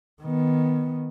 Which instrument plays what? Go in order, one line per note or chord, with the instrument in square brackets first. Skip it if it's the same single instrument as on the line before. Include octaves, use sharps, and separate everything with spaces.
[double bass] D#3 B3